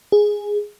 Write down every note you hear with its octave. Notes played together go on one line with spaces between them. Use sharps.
G#4